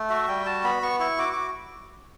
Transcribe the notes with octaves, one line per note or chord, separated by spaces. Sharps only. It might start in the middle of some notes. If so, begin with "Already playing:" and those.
Already playing: A3
F#4 E5
G3 G5
F#4 A5
B3 B5
B3 C#6
E4 C#6
F#4 D6
F#4 D6